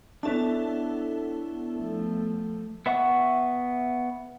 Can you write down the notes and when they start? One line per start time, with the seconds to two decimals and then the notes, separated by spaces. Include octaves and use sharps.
0.23 B3 D4 E4 A4 C#5 A5
1.76 F3 A3
2.86 B3 E5 F#5 C#6